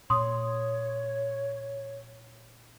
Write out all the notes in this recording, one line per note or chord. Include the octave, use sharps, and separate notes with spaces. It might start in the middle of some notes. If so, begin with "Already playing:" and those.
A#2 C#5 C6 D#6